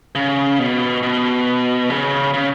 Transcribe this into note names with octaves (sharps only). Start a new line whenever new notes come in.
C#3
B2
B2
C#3
C#3